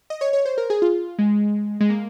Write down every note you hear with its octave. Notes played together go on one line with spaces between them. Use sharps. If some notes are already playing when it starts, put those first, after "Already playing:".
D#5
C#5
C#5
C5
A#4
G#4
F4
G#3
G#3
A#3